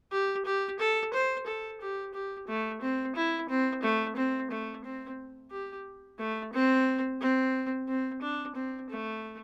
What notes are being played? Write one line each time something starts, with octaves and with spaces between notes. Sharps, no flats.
G4
G4
A4
C5
A4
G4
G4
A3
C4
E4
C4
A3
C4
A3
C4
G4
A3
C4
C4
C4
D4
C4
A3